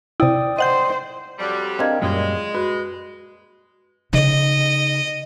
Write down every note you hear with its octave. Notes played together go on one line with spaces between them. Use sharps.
C3 E4 D5 G5 D#6
C5 D#5 F#5 G6
F2 F#3 G3
C4 D4 A#4 D#5 F5 G#6
F#2 A#2 G3 G#3
F#4 B4
C#3 D#4 D#5